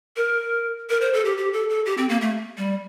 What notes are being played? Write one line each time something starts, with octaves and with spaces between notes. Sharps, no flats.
A#4
A#4
C5
A4
G4
G4
A4
A4
G4
C4
A#3
A3
G3